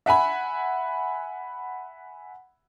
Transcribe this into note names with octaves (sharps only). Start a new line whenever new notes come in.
E5 F#5 G#5 B5